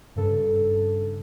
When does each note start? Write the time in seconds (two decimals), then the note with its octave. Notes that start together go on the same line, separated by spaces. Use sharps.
0.16 G2 C#3 A4